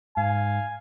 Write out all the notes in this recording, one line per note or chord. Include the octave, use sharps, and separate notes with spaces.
G#2 F5 G#5